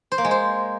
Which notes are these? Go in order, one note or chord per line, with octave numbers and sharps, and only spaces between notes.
C5
A#3
G#3
C5